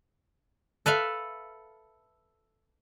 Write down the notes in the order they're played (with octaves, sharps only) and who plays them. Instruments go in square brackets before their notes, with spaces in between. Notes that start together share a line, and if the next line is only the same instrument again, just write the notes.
[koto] A4 B4 E5 F5